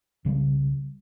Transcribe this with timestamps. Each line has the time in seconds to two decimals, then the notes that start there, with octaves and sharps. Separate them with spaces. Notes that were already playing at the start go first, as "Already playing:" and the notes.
0.25 C2 C#3 F#3 G3